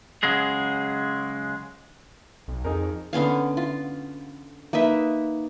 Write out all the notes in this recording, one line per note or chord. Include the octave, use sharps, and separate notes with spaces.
C#3 F#3 G#3 G#4
B1
F2 D#4 G#4 A#4
D3 B3 C#4 F5
F4
A#3 D#4 B4 E5